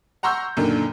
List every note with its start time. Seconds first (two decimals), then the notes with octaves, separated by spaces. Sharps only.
0.23 F#5 A#5 C6 C#6 E6 G6
0.57 F#2 A#2 D3 D#3